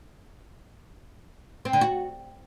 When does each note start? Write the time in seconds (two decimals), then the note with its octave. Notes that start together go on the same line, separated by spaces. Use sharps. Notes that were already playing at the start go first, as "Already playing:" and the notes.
1.65 C4
1.73 D3
1.81 F#4